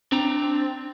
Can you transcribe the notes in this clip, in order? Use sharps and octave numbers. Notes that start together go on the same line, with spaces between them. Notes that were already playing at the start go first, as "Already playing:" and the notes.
C4 D4 A#5